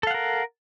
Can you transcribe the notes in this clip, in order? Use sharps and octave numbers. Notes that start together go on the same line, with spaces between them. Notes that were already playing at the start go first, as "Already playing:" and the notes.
A4 A#4 F5 F#5